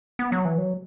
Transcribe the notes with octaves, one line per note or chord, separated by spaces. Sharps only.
B3
F#3
E3
F#3